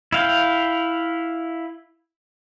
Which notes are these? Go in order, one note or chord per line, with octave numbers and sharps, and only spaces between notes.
E4 F5 G5